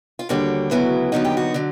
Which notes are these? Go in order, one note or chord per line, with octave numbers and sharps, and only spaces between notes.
F4
D#2 D3 G3 F#4
D2 C#3 F#3 B3 E4
D#2 D3 F#3 B3 D#4 F#4
G4
F#4
D3 F#3